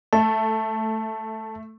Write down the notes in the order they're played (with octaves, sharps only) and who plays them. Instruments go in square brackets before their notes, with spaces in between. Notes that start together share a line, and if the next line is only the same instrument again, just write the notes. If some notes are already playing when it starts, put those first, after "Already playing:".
[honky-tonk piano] A3 [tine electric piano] A5